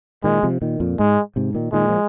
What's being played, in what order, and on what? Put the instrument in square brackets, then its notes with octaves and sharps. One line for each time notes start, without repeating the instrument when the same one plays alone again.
[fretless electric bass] A#2 D#3 [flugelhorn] G#3
[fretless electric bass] C3 F3
A#2 D#3
F2 A#2
[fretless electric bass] G#2 [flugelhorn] G#3
[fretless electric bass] G#2 C3
A#2 D#3
[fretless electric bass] A#2 D#3 [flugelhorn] G#3
[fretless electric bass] F3